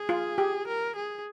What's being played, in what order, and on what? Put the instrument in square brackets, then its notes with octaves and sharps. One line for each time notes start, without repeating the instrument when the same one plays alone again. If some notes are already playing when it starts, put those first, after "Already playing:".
Already playing: [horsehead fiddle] G#4
[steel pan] F4
G4
[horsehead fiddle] A#4
G#4